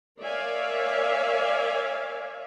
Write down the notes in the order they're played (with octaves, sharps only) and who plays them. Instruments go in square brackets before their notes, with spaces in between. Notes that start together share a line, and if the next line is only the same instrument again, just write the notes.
[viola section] A#4 C#5 D5 E5 F5 G#5